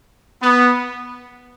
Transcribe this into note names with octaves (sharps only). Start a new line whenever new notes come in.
B3